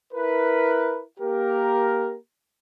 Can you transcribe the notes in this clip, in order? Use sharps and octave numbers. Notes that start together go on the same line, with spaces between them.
E4 A#4 B4
A#3 G4 A#4